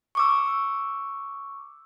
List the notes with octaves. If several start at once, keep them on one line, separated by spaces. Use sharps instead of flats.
C#6 D6 E6